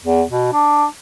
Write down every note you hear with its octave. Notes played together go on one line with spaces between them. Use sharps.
E2
B2
D4